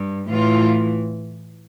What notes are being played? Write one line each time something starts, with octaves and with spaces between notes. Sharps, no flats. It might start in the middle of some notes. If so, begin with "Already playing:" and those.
Already playing: G2
A2 E3 F4